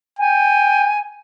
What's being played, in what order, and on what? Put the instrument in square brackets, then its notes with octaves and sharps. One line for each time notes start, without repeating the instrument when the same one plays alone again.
[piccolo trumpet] G5 [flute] G#5